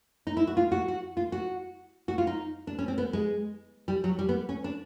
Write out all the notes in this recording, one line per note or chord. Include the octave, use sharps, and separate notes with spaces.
D#4
E4
F#4
F4
F#4
F#4
F4
F#4
F#4
F4
D#4
D4
C#4
C4
B3
G#3
G3
F#3
G3
B3
C#4
D4